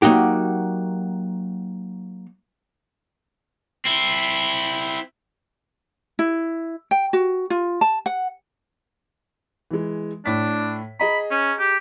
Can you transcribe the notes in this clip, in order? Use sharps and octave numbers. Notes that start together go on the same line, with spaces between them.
F#3 A#3 D#4 F#4 G4
C4 E4
E4
G5
F#4
F4
A5
F#5
E3 G#3
A2 D4 B6
G#4 D#5 A#5 B5
C#4
G4